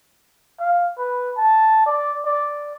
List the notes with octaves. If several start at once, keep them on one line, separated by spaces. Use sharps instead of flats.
F5
B4
A5
D5
D5